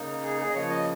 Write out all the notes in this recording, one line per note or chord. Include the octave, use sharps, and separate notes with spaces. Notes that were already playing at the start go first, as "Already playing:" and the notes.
Already playing: C#3 A#3 D#4
G#4
G#4
D#5
C#3 F3 A#3 C#5
D#5